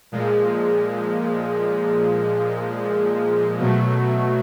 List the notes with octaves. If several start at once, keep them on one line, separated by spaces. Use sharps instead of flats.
A#2 F3 G#3
B2 F#3 A3